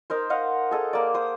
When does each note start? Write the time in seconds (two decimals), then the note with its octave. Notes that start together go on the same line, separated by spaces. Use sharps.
0.10 D#4 A#4 C5
0.30 C5 D#5 F5 F#5
0.71 G#4 A4 D#5
0.93 A#3 D5
1.14 C5 D#6